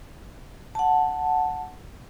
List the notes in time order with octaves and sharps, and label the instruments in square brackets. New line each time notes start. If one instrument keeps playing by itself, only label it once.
[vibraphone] F#5 A5